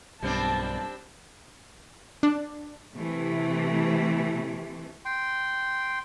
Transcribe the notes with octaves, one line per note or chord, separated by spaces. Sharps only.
B1 G2 B2 G3 C4 D4 A5
D4
C3 E3 A3
G5 C6